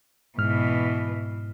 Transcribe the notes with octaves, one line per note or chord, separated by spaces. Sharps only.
G#2 B2 E3 F6